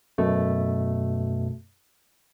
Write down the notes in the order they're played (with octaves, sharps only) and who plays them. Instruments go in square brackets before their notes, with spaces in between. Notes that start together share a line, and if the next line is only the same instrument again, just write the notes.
[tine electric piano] F#2 B2 A3